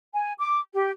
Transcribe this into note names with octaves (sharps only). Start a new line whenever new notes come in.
G#5
D6
G4